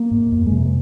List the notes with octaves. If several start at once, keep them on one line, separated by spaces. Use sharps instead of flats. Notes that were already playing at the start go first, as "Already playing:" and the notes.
Already playing: A#3
G#2
F2
G#3
C3
A#3